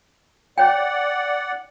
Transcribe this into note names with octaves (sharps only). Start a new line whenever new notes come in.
C#5 D5 F#5 G5